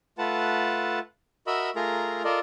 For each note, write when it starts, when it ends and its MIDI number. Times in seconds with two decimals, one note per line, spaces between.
0.18 0.99 57
0.18 0.99 65
0.18 0.99 71
0.18 0.99 78
0.18 0.99 81
1.47 1.70 66
1.47 1.70 70
1.47 1.70 75
1.47 1.70 76
1.47 1.70 83
1.47 1.70 88
1.76 2.23 57
1.76 2.23 65
1.76 2.23 68
1.76 2.23 70
1.76 2.23 82
2.24 2.40 65
2.24 2.40 69
2.24 2.40 70
2.24 2.40 74
2.24 2.40 75